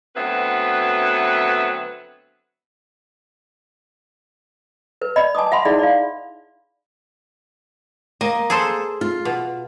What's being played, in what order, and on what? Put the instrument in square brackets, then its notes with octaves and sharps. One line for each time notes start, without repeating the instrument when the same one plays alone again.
[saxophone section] D2 F#3 B3 C4 B4 E5
[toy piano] A#4 B4
D5 D#5 B5
G#5 A5 D6 D#6
E5 F#5 B5 C6
D#4 E4 G#4 D5 F#5 B5
D5 F5
[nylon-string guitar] A#3 [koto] D#5
[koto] G#4 A4 C5
[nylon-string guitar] F4
[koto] B2